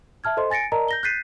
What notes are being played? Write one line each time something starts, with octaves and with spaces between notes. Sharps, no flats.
E5 A5 F6 G#6
A4 C5 D#5 C6
G#5 A6 A#6 C#7 D7
A#4 D5 D#5 A5 A#5
G6 A#6 G7
F#6 G6 A6 B6 C7 D#7